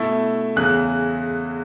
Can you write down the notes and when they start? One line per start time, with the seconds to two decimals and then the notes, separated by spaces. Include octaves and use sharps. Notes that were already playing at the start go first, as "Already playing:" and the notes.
Already playing: B2 A3 E4
0.56 E2 C#3 E3 F#6